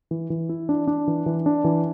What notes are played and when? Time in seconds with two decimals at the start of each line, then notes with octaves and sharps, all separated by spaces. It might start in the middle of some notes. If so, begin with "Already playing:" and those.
0.11 E3
0.30 E3
0.49 E4
0.69 D4
0.87 D4
1.08 E3
1.26 E3
1.46 D4
1.64 E3